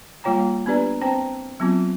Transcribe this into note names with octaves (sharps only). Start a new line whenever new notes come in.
G3 A#3 F4 C#5 G5 A#5
B3 D4 G4 B4 D5 A#5
C4 C5 G5 A5 A#5
F#3 B3 C4 F4